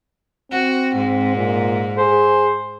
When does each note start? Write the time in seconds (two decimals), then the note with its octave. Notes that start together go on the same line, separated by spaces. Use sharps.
0.51 C4 F#4
0.96 G#2
1.36 A#2
1.98 G#4 C5